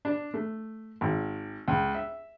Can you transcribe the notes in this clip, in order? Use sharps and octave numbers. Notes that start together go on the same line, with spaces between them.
D4
A3
G#1
C#2
E5